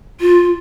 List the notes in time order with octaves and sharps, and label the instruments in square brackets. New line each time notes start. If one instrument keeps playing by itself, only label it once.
[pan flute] F4